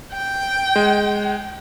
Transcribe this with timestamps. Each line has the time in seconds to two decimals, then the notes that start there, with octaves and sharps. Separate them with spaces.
0.12 G5
0.76 G#3